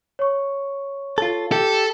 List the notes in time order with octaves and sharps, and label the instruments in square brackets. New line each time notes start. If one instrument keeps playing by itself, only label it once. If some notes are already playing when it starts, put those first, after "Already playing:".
[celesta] C#5 C#6
[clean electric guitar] F4 A4
[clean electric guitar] G4 [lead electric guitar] A4